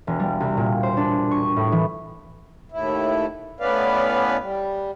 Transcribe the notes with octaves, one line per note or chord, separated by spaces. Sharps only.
E1
G3
C2
A#2
C5
D4
C#6
A2
E3
D#2 A2 E4
A2 B3 C#4 B4 D5 F5
G3